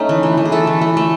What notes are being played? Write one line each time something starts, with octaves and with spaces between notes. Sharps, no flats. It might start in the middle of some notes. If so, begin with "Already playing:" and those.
Already playing: A3 C#4 D#4
E3
E3
E3
G#4
A3 A4
E3
A3
A3